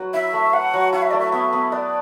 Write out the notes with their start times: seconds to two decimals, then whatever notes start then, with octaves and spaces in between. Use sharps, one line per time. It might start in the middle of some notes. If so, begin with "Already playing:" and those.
Already playing: F#3 B4
0.14 E4 E5
0.33 A3
0.53 B4 F#5
0.73 F#3
0.93 E4 F#5
1.02 E5
1.11 A3 D5
1.20 E5
1.32 B3 E5
1.53 B3
1.72 B4 D5